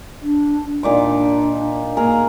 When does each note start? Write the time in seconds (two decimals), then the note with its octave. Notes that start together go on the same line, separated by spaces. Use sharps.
0.22 D4
0.83 A#2 D4 D#4 D6
1.97 A#3 G#4 A#4